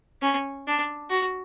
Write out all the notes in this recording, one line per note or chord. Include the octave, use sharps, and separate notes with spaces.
C#4
D4
F#4